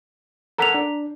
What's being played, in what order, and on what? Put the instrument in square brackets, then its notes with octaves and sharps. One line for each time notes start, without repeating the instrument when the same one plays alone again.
[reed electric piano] A4 A#4 F#5 [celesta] A#5 B6 F7
[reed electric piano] D4